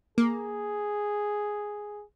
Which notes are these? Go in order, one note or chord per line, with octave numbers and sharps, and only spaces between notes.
A#3 G#4